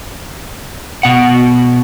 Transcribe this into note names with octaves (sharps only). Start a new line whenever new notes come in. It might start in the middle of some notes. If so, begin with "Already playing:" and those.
B2 F#5